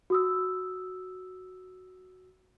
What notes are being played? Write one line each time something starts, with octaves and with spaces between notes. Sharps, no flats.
F#4 D#6 E6